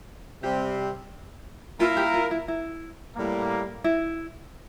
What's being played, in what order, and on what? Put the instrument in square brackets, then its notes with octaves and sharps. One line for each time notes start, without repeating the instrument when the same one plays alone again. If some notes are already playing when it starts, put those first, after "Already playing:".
[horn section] C3 G3 C4 [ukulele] G4
[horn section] A#3 E4 A#4 [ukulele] F4
[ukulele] G4
F4
E4
E4
[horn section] A2 G3 A#3
[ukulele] E4